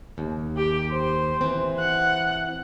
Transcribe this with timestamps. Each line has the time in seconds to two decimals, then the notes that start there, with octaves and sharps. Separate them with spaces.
0.18 D#2
0.57 G4
0.92 C5
1.41 E3 C4
1.79 F#5